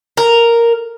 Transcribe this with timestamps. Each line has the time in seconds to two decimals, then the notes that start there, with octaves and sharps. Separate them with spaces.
0.17 A#4